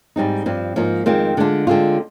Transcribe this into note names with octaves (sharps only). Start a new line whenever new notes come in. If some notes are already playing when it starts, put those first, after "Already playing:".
G#2 G3 C4 D#4
G2 F3 C4
G#2 F3 A#3 D#4
F2 D#3 G#3 C4 F4
D3 G#3 D4 F4
D3 G#3 C4 F4